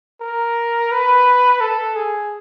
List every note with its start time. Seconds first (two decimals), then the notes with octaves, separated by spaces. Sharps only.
0.21 A#4
0.92 B4
1.61 A4
1.96 G#4